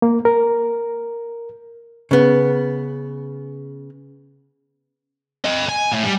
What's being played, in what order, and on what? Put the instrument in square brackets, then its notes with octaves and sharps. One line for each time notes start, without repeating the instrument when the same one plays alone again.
[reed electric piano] A#3
A#4
[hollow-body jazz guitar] C#3 B3
[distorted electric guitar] A4 D#5
G#5
A2
G3